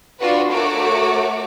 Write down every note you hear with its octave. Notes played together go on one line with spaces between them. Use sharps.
D4 F4 F#4 B4
A3 F#4 A#4 C#5 D6